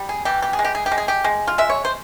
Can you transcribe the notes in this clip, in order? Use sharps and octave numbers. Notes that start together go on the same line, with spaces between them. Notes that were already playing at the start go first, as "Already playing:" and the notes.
Already playing: G3
G#4
E3 G4
G4
G#4
G#3
G4
G#4
G4
G#3
G#4
G4
G#3
F4
G#3 E5
C#5
C5